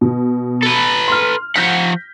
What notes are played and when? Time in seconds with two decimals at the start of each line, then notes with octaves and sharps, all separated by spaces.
0.01 B2
0.63 A4 B4
1.08 C6 F6
1.56 F3 F#5 G6 A#6 B6